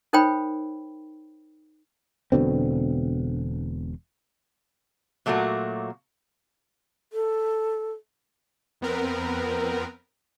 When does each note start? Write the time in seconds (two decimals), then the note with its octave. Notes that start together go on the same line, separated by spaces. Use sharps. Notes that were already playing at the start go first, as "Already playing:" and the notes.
0.13 D#4 A#4 C5 C#5 G5 B5
2.32 E1 B2 D3 C4
5.26 A#2 F#3 A3 A#3 F#4
7.13 A4
8.81 F2 B3 C4 A#4 B4